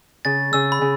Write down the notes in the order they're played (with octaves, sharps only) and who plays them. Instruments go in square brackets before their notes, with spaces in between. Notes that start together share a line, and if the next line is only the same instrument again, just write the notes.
[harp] C#3 [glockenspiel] A6
[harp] C#3 [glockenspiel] E6
[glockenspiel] B5
[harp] C#3